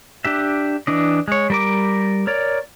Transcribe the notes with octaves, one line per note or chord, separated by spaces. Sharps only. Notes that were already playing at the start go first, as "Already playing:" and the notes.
D4 G4 E5
E3 D4 D#5
G#3 C#5
G3 A#4 D6
A#4 C#5 D5